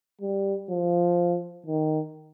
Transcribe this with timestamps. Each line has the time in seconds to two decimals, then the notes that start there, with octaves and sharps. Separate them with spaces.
0.21 G3
0.70 F3
1.66 D#3